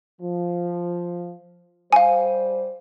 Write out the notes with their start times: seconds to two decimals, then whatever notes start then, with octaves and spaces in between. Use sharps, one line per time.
0.21 F3
1.93 G3 C5 F5 G#5